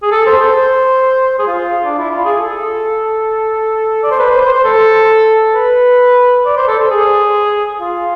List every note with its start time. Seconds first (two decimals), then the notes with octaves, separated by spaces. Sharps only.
0.02 G#4
0.11 A4
0.26 C5
0.42 C5
1.39 G#4
1.47 F4
1.84 D4
1.98 E4
2.11 F4
2.25 G#4
2.37 A4
4.03 D5
4.11 C5
4.19 B4
4.30 C5
4.42 C5
4.53 C5
4.64 A4
5.54 B4
6.45 D5
6.57 C5
6.68 A4
6.79 C5
6.90 G#4
7.80 F4